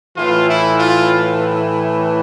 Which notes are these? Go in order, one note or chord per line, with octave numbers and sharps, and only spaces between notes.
A2 E3 F4
E4
F4